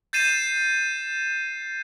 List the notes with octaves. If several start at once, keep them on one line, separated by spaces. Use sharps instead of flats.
G6 A6 C7 D#7 E7